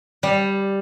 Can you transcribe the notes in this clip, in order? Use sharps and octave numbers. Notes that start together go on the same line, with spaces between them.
G3